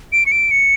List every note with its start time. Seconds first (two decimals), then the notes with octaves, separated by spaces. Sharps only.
0.13 D7
0.26 C#7
0.32 D7
0.51 C#7